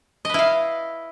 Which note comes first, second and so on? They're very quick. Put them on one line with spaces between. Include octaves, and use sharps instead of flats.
D#5 B4 E4 F5